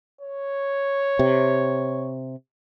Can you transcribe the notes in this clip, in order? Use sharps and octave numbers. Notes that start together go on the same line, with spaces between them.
C#5
C3